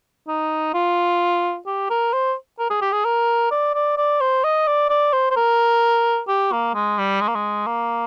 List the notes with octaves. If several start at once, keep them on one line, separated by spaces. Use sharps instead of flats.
D#4
F4
G4
A#4
C5
A#4
G#4
G4
G#4
A#4
D5
D5
D5
C5
D#5
D5
D5
C5
C5
A#4
G4
A#3
G#3
G3
G#3
A#3
G#3
A#3